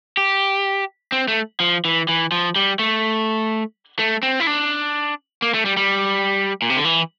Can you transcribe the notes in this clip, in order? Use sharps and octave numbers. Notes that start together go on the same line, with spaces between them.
G4
C4
A3
F3
E3
E3
F3
G3
A3
A3
C4
E4
D4
A#3
A3
G3
G3
A#2
C3
D3
E3